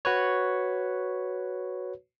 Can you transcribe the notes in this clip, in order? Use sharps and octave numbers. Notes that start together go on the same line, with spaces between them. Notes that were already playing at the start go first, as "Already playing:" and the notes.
F#4 B4 C#5